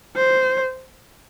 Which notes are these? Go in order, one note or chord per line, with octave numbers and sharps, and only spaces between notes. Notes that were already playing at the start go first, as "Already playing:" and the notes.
C5